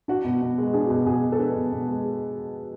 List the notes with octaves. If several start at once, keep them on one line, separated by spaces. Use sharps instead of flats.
D4 F#4
B2
B2
G#3
D4 G#4
F#4
B2
G#4
B2 G#4
G#3
A4
D4 B4
B2
B2
G#3